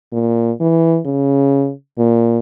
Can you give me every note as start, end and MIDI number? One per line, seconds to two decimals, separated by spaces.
0.13 0.52 46
0.61 1.00 52
1.06 1.72 49
1.98 2.39 46